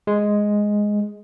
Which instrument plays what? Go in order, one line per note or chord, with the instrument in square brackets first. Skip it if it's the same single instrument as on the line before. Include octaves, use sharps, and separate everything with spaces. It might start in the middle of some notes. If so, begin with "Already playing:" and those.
[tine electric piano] G#3